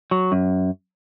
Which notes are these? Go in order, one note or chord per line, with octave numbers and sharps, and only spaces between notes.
F#3
F#2